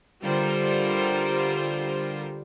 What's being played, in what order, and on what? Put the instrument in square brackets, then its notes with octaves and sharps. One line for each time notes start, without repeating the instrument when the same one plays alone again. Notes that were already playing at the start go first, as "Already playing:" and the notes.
[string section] D3 G3 F4 A#4 C5